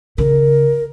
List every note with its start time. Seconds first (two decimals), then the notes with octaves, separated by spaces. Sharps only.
0.18 C#3 C#4 A#4